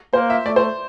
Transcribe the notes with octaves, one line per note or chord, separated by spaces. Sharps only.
A#3 C5
E5
A3 D5
C5